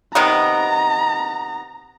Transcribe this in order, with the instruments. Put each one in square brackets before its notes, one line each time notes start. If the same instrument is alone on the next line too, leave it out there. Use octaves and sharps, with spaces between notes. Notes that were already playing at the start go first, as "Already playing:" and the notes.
[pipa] C3 D#3 B3 [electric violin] A#5